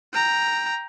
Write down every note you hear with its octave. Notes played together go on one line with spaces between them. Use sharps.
G5 A#5